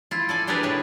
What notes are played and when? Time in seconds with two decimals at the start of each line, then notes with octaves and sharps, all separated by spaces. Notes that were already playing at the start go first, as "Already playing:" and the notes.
0.11 E4 F4
0.29 A4 D5 G#5
0.47 D4 G4 G#4 A#4 B4 D5
0.63 A2 C3 D4 C#5